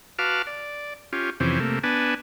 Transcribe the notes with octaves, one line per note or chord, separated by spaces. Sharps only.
F#4 B4 F5 A5 D6 F6
D5
C#4 F4 G4
F2 C3 E3 C#4 G4 C5
C3 A3 A#3
B3 D4 B4 G#5 A5